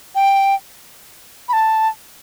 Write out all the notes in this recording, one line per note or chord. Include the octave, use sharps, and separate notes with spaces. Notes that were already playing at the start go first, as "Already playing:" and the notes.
G5
B5
A5